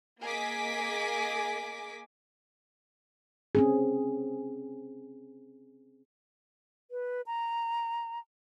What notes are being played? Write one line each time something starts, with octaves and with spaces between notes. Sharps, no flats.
A#3 G#4 D#5 G#5 D6 B6
C4 C#4 G#4
B4
A#5